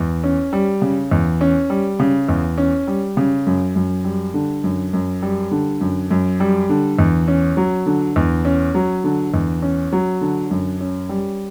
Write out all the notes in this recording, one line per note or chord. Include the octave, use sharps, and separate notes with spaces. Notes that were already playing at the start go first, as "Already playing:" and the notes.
Already playing: E2
C#4
G3
C#3
E2
C#4
G3
C#3
E2
C#4
G3
C#3
F#2
F#2
G3
D3
F#2
F#2
G3
D3
F#2
F#2
G3
D3
E2
C#4
F#3
D3
E2
C#4
F#3
D3
E2
C#4
F#3
D3
F#2
C#4
G3